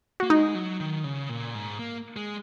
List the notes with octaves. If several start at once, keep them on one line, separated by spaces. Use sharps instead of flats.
A#3 F#4
G#3 D#4
F#3
D#3
C#3
A#2
G#2
A#3
G#3